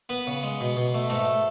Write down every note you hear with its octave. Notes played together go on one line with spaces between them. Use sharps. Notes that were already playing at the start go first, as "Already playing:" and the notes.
B3 B4
C#3
G#3
B2
B2
A3
G#2 A3 A4